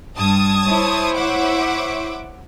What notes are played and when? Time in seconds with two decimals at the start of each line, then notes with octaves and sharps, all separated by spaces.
0.16 G2 A5 D#6 G#6
0.66 E4 C5 C#5
1.15 E5 F#5 D6